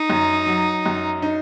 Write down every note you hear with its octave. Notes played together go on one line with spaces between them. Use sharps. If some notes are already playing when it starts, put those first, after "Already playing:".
Already playing: D#4
F#2
F#3
F#2
D#4